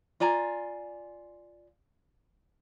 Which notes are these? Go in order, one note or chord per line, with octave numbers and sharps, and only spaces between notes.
F4 D5 G#5 A#5